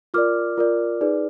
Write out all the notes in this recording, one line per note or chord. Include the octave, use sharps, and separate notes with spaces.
F4 A#4 D5 D6 F6
F4 A#4 D5
D#4 G#4 B4 D5